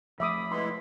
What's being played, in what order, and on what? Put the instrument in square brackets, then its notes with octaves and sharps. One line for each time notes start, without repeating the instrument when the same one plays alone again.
[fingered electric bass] F3 A3 [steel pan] E5 D6 D#6 [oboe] B5
[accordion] G#3 B3 E4 [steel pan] C6